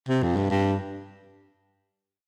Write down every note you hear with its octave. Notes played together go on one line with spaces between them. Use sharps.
C3
F2
G2
G2